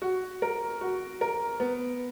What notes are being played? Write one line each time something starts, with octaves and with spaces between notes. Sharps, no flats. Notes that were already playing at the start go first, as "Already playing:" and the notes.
F#4
A#4
F#4
A#4
B3